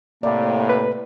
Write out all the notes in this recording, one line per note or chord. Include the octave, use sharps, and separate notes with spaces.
A2 C3 A#3 D5
B4